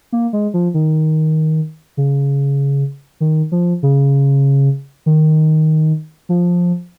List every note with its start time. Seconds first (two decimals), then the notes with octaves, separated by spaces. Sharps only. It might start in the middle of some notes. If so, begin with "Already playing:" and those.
0.12 A#3
0.33 G#3
0.54 F3
0.74 D#3
1.97 C#3
3.21 D#3
3.52 F3
3.83 C#3
5.06 D#3
6.29 F3